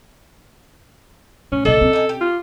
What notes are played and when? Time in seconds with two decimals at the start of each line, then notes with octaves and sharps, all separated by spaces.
1.52 A2 C#4
1.65 A#1 D3 D4 D#4 A4
1.81 C4 C#4
1.93 D#4 G#5
2.09 G4
2.21 F4